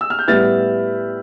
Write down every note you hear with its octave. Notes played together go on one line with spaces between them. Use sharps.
E6
F6
G6
A2 G3 B3 E4 F6 A6